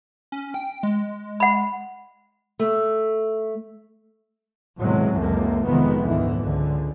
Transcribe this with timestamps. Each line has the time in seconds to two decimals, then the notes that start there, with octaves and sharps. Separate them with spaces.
0.32 C#4
0.54 G5
0.83 G#3
1.40 F#5 B5
2.59 A3
4.80 E2 A2 C3 D#3 F#3 G#3
5.18 C#2 F#2 E3 A3 A#3
5.66 F1 F2 D#3 E3 G#3 B3
6.05 D2 G#2 D#3 E3
6.38 C#2 D3